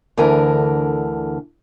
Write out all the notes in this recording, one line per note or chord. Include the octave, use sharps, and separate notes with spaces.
D2 D3 E3 A#4 G#5